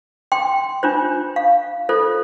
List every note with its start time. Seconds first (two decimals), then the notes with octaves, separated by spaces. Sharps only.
0.32 G5 C6
0.83 D4 F4 C5
1.36 F5
1.89 F4 A4 C5